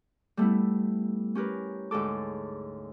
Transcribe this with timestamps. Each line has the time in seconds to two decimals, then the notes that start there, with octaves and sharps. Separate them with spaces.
0.37 G3 A3 B3 E4
1.35 C#4 G4 A#4 B4
1.91 D2 G#2 C#4 A4 D6